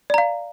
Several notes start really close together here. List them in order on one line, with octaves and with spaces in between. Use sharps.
D5 A#5 F5